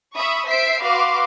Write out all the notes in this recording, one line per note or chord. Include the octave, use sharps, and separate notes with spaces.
E5 B5 C#6 D#6
C5 E5 B6 C7 D7
F#4 B4 F5 C6 D6